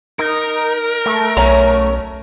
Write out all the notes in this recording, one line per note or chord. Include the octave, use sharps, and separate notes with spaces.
D#4 A#4
A3
B1 C#4 A#5